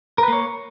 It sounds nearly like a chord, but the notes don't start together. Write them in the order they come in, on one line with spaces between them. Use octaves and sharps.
A#4 B4 A#3 C#5